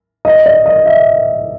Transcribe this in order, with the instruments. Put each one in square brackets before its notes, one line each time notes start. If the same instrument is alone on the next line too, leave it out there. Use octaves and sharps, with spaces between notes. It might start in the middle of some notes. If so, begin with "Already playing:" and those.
[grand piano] D#5
D5
D#5
E5